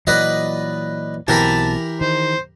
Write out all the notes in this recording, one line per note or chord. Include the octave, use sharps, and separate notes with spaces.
A#2 E3 F#3 B4 D5 D#5
B1 B2 E3 C4 G4 A#4 A5 B5
D#3 C5